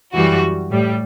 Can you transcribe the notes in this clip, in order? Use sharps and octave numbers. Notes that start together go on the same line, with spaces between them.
F#2 E3 G3 F#4
A2 G3